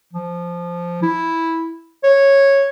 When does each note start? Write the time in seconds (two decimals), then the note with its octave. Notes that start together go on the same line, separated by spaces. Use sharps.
0.13 F3
1.03 E4
2.04 C#5